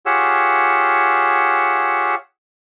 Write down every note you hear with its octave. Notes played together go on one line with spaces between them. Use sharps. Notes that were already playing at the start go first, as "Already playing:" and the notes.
F4 G4 G#4 C#5 F#5 E6